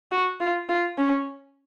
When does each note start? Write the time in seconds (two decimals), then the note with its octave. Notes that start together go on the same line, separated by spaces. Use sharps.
0.12 F#4
0.41 F4
0.69 F4
0.98 C#4